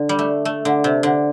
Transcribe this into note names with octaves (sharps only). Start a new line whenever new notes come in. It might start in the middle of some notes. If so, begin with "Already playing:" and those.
Already playing: D3
G3
A3
A3
D3
C3
D3